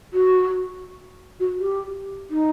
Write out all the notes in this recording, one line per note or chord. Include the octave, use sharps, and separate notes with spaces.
F#4
F#4
G4
D#4